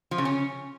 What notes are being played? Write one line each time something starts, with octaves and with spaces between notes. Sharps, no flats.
F3
C#3
C#4